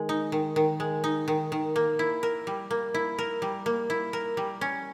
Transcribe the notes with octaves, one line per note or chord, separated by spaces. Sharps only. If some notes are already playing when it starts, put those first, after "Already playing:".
Already playing: D#3 G#3
D#4
D#3
D#3
G#3
D#4
D#3
D#3
A#3
E4
A#4
G3
A#3
E4
A#4
G3
A#3
E4
A#4
G3
C#4